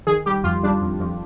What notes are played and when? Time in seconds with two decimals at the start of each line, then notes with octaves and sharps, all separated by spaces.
0.07 D#3 G#4
0.26 G3 G4
0.44 F2 F4
0.64 G3 D4
0.81 F2
1.00 F2